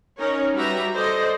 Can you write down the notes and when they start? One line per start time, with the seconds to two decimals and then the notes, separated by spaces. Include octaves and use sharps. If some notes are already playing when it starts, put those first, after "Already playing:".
0.18 C#4 D#4 A#4 C#5
0.55 G3 F#4 G4 B4 E5 A#5
0.93 A4 C5 D5 D#5